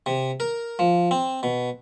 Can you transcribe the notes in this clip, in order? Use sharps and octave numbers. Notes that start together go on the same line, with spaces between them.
C3
A#4
F3
C4
B2